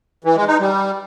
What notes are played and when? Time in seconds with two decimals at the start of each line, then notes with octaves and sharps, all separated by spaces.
0.24 E3
0.36 G#3
0.48 D#4
0.60 G3